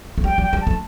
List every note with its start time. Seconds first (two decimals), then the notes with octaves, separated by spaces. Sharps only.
0.18 A3
0.24 G3 G5
0.38 G3
0.43 G5
0.53 G3
0.61 A5
0.67 A3